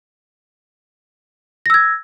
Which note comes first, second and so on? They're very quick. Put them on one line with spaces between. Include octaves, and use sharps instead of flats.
A#6 E6 G#6